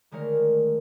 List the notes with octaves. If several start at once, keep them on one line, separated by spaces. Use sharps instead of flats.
D3 D#3 G#3 A3 A#4 C#5